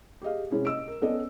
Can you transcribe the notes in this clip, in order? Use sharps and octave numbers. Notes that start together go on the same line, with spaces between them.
G4 G#4 D#5 F5
C3 G#3 C#4 E4 G#4
D#5 E6 D7
A#4
B3 C#4 A4 D5 D#5